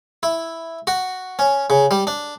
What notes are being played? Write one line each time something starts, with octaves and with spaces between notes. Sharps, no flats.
E4
F#4
C#4
C#3
G3
D4